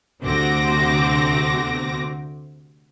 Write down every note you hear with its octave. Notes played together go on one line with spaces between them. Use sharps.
D2 C3 C4 F#4 D6 A#6